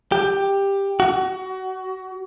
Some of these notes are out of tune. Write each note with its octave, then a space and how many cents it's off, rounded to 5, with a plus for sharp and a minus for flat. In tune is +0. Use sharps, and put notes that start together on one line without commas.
G4 +10
F#4 +25